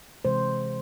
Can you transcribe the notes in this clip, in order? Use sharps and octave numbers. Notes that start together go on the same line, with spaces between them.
C3 E3 G#3 C5